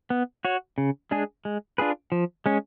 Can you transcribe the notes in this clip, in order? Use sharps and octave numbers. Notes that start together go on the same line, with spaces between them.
B3
F#4 C#5
C#3
G#3 D4 G#4
G#3
D4 F4 G#4 B4
F3
G#3 C#4